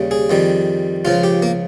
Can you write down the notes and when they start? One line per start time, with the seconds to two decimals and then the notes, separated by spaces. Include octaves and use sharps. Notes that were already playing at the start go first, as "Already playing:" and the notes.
Already playing: D#2 C#3 G3
0.11 G#4
0.30 F2 D#3 G3
1.05 C#2 C#3 F3 F4
1.24 G4
1.42 A#3